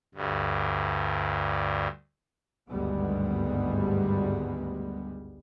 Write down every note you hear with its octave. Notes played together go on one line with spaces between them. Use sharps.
D2 G2
G#1 D2 G2 G3 G#3 B3